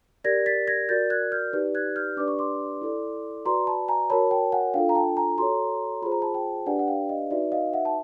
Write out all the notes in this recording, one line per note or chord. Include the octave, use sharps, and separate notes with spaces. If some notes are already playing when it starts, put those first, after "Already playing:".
G4 A#4 D5 G#6 A#6
A6 B6
G#6 A#6
F#4 A#4 D5 G6 A6
F#6 G#6
F6 G6
D#4 G4 B4 D5
F#6 G#6
F6 G6
D4 G4 B4 D5 D6
C#6
C6 D6
E4 A4 D5
F#4 B4 D5 A#5 C6
A5 B5
G#5 A#5
F#4 A#4 C#5 A5 B5
G5 A5
F#5 G#5
D4 F4 A4 F5 G5
A#5
G5 A5
G#5 A#5
F#4 A4 C#5 A#5 C6
F4 G#4 C5 B5
A#5
A5 B5
G5 A5
D4 G4 B4 D5 F#5 G#5
F#5
F5 G5
D#5 F5
D#4 F#4 B4 D5 E5
D#5 F5
E5 F#5
A5